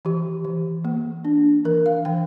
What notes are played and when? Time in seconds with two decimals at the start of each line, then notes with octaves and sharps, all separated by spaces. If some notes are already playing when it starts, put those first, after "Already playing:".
0.05 E3 G4
0.45 E3
0.85 A#3
1.25 D4
1.65 E3 A#4
1.86 F5
2.05 E3 G5